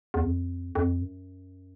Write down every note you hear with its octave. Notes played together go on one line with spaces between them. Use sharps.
E2
F2
F2
F#2